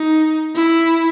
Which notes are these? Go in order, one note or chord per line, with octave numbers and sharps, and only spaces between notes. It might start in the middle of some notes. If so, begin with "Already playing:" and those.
Already playing: D#4
E4